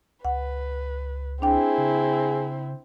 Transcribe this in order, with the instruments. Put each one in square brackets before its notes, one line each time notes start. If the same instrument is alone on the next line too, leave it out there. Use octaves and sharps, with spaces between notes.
[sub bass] C#2 [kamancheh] B4 [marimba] F#5
[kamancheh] C4 E4 [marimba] D4 G5 [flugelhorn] G#4
[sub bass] C#3